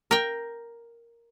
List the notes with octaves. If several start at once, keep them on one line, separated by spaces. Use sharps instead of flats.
A#4 G5